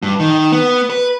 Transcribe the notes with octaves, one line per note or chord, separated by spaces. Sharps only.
G2
D#3
B3
B4